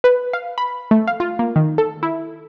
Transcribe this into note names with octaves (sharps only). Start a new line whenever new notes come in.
B4
F5
B5
A3
F5
F4
A#3
D#3
A4
E4